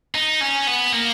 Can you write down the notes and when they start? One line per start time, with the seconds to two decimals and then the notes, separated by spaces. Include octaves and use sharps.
0.15 D#4
0.41 C#4
0.67 B3
0.93 A#3